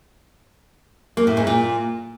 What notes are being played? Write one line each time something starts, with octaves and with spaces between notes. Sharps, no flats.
A#3
A2
G#2
A#2